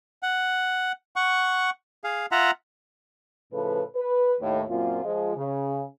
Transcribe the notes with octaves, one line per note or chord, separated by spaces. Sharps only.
F#5
F#5 C#6
G#4 F5
F4 E5 F#5 A#5
A2 C#3 F3 A4 B4
B4
D#2 A2
F#2 A#2 A#3 C4 F4
F3 G#3
C#3